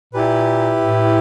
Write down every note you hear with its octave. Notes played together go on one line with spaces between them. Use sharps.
A#2 E4 G4 B4
A2